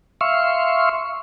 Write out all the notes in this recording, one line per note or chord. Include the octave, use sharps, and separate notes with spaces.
E5 F5 C6 C#6